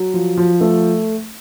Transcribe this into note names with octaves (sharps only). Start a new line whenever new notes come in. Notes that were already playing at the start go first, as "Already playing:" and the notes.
Already playing: F#3
F3
F3
A3